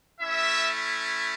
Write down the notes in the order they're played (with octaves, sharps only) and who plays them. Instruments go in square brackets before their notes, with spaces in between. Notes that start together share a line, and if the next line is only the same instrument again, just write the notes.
[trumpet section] A3 C#4 E4 E5